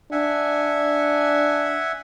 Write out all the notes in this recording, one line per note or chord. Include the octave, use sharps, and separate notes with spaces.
D4 E5 F#5 G#5